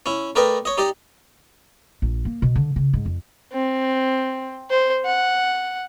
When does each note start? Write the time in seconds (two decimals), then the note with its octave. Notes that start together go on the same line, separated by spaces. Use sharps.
0.06 C#4 E4
0.35 A3 A#4 B4 D5 D#5 G5
0.65 C#5 D#5
0.78 D#4 G4 D5 D#5
2.02 A#1
2.25 A#3
2.42 B2
2.55 D3
2.76 C#3
2.93 G#2
3.06 F2
3.52 C4
4.70 C5
5.05 F#5